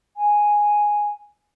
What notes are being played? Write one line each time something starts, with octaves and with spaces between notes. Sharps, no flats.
G#5